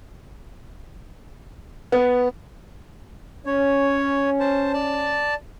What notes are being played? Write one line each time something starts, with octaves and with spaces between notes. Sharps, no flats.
B3
C#4 C#5
C5 A5
D5 A5